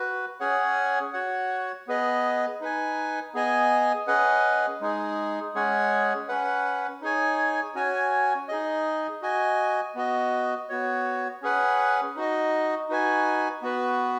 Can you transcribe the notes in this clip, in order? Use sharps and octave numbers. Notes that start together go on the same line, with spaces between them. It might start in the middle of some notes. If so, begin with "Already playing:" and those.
Already playing: F#4 B4
C#4 G#4 C#5 F#5
F#4 C#5 F#5
B3 G#4 B4 D#5
D#4 B4 G#5
B3 G#4 D#5 G#5
C#4 G#4 B4 D#5 F#5
G#3 D#4 G#4
G#3 C#4 G#4 C#5 F#5
C#4 B4 F#5
D#4 G#4 C#5 G#5
C#4 F#4 C#5 G#5
D#4 G#4 D#5
F#4 D#5 G#5
B3 F#4 D#5
B3 F#4 C#5
C#4 G#4 B4 F#5
D#4 F#4 D#5
D#4 F#4 B4 G#5
B3 F#4 B4